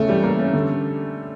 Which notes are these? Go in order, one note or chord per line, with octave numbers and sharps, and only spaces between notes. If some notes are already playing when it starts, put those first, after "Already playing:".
Already playing: C#3 A3
E3 G3
A#3
C#4
D3